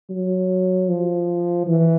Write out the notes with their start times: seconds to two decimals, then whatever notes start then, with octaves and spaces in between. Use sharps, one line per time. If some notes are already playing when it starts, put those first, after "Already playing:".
0.10 F#3
0.89 F3
1.67 E3